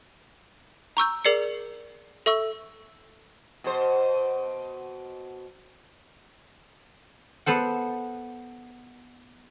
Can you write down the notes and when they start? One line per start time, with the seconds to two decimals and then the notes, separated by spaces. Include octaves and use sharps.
0.97 A#5 C#6 E6 G6
1.25 G#4 A#4 D5 C7 C#7
2.26 A4 E5 C#6 E6
3.64 B2 C5
7.46 B3 A4 C5 F#5